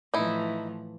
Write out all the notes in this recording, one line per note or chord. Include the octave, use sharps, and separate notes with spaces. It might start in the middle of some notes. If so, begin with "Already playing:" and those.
A2 E3 F3 D#4 E4